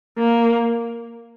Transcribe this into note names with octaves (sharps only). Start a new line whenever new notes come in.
A#3